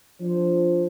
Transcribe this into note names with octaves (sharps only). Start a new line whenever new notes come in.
F3 D4 C5